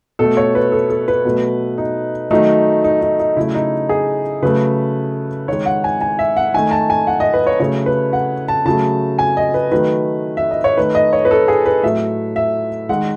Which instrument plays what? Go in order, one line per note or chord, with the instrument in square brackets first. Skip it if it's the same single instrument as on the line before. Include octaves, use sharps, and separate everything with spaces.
[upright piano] B2 A3 A4
C#5
B4
A4
A4
B4
B2 F#3 A3
D#4
D#3 F#3 A3 D#4
D#4
D#4
D#4
C#3 F#3 A3 E4
D#4
G#4
C#3 F#3 A3 B4
D#3 G#3 C#5
F#5
G#5
G#5
E5
F#5
D#3 A3 G#5
A5
G#5
F#5
D#5
B4
C#5
C#3 F#3 A3 C#5
B4
F#5
A5
C#3 F#3 A3 A5
G#5
D#5
B4
D#3 F#3 A3 B4
E5
D#5
C#5
D#3 A3 B4
D#5
C#5
B4
A4
G#4
B4
A2 F#3 A3 E5
E5
D#3 G#3 F#5